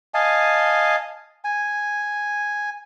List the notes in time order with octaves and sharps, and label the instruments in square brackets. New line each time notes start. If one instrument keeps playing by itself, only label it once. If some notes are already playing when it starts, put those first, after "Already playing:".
[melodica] D#5 F5 G#5 A5
G#5